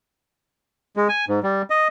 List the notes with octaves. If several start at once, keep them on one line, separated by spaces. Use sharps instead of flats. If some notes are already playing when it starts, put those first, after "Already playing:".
G#3
G#5
G#2
G3
D#5